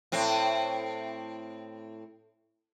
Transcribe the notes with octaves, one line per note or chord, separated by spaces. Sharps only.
A2 C4